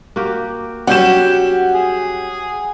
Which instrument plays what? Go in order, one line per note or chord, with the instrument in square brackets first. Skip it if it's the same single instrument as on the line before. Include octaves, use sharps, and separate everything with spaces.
[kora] A#3 F#4 G4
[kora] F#3 G3 [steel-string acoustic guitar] C#4 F#4 G4 [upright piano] F#5 G6 E7
[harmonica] G#4